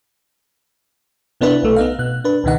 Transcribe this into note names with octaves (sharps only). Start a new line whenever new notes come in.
C3 B3 D4 E4 B4
B1 A3
B3 D#4 F5
B2 F#6
D4 B4
C#2 B2 D#3 D#4 F#5